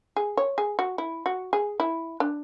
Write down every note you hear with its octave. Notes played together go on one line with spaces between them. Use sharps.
G#4
C#5
G#4
F#4
E4
F#4
G#4
E4
D4